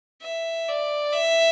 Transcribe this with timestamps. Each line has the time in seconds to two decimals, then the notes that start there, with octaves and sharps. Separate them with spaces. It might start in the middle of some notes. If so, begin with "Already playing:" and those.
0.22 E5
0.68 D5
1.13 E5